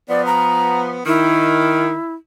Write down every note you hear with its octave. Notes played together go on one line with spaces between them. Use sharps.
F3 B3 D5
A#5
D#3 E4